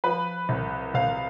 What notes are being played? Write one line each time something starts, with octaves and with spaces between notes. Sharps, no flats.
F3 B4
C2
C2 F5